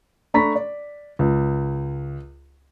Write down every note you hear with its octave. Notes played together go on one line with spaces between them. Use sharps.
A3 D4 A#5 B5 C#6 B6
D5
C#2